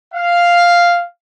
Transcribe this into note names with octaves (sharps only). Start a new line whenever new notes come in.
F5